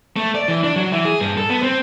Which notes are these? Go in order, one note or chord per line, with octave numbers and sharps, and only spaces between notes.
A3
D5
E3
D4
F#3
E3
G#4
G2
A4
B3
C4